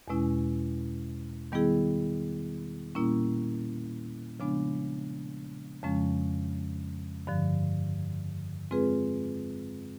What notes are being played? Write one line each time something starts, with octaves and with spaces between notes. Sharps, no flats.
E2 B2 G#3 C#4 E4
D#3 G3 B3 E4 G#4
A#2 G3 A#3 C#4 E4
C#3 F3 G#3 B3 D4
F2 C#3 F3 G#3 C#4
G2 D3 F3
G#3 C4 F4 G#4 B4